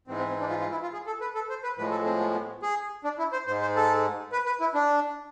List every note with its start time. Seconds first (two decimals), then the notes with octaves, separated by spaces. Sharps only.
0.07 G#2 E3 G#3 C4
0.18 C4
0.29 C4
0.40 D4
0.50 F4
0.60 F4
0.71 E4
0.82 F4
0.93 G#4
1.07 A4
1.21 B4
1.35 A4
1.49 C5
1.63 B4
1.77 A2 F3 G#3 B4
1.91 A4
2.05 C4
2.20 B3
2.33 B3
2.62 G#4
3.04 D4
3.18 E4
3.32 C5
3.47 G#2 G#3 C5
3.62 C5
3.76 A4
4.32 B4
4.46 B4
4.60 E4
4.74 D4